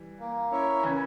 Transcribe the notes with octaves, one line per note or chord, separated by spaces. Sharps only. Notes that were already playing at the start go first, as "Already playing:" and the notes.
Already playing: E3 G3
A#3
C#4 E4 A#4 C#5
C#3 E3 C#4